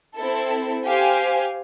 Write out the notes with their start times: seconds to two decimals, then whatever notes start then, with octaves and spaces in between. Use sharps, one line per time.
0.16 C4 E4 A4
0.85 G4 C5 F5 G#5